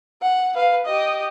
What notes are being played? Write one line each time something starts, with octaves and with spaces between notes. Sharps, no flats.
F#5
B4 F5
G4 D#5